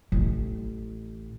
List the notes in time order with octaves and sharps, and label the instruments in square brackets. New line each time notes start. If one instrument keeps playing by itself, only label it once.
[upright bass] A1